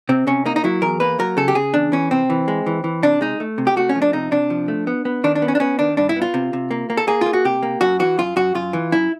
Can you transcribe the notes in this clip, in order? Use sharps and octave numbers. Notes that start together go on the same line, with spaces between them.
C3 C4
C3 C#4
A#3 D#4
D#4
F#3 E4
E2 A#4
A#3 B4
F#3 A#4
C#3 A4
G4
C#3 G#4
E2 D4
E3 C#4
C3 C4
E3
G#3
E3
E3
C3 D4
G#3 D#4
A3
C3
G4
A3 F#4
C#4
F3
D4
C3 D#4
C3 D4
F3
A3
B3
B3
D#3 D4
D4
B3
C#4
D4
B3 C#4
D#3 D4
G2 D4
E4
B3
F4
C3
C3
A#3
A#3
A4
A#3 G#4
A#3 F4
F#4
C3 G4
A#3
F#2 F#4
E3 F#4
F#2 F4
F#2 F#4
F#2 F4
E3
F#2 E4